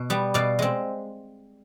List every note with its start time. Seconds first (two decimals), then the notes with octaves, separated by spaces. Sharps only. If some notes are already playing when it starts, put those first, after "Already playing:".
Already playing: B2
0.10 G3 B3
0.34 B2 D5 F5
0.59 G#3 C4